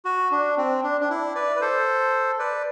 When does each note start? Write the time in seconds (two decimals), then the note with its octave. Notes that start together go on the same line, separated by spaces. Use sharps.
0.05 F#4
0.31 D4
0.57 C4
0.84 D4
1.01 D4
1.10 E4
1.35 B4 D5
1.56 B4
1.61 A4 C5
2.39 B4 D5